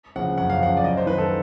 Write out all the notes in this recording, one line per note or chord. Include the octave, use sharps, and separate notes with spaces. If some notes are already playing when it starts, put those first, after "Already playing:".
C#3 F3 F#5
F#2 F#5
F5
C#3 F3 F#5
D5
F#2 D#5
C5
D#3 B4
A4